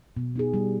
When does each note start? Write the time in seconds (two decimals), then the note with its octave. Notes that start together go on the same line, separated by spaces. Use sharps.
0.17 B2
0.36 B3 D#4 G#4
0.54 G3